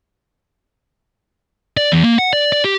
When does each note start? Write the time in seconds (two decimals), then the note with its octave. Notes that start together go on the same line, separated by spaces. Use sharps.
1.77 D5
1.92 E2
2.03 A#3
2.19 F#5
2.33 D5
2.52 D5
2.64 G4